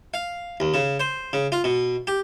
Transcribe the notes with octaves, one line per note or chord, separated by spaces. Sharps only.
F5
D#2
C#3
C5
C#3
F4
B2
G4